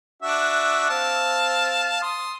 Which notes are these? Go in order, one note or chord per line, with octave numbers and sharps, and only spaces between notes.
D4 F#4 E5
C4 F5 A5
C6 D#6